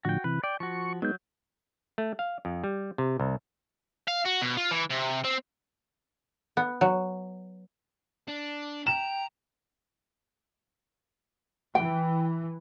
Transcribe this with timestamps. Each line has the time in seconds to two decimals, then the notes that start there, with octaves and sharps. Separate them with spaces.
0.05 A2 D3 F3 F#4 G5
0.24 C3 E3 B4
0.44 D5 G5
0.60 F3 F#4 C#6
1.02 F#3 G#3 B3 D#4 G6
1.98 A3
2.19 F5
2.45 F2
2.64 G3
2.98 C3
3.20 C2
4.08 F5
4.26 F#4
4.42 B2
4.57 F4
4.71 E3
4.90 C3
5.25 C4
6.57 B3
6.81 F#3
8.28 D4
8.87 G5 A#5 E7
11.75 E3 G5